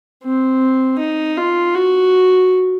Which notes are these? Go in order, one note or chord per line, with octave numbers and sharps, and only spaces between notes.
C4
D#4
F4
F#4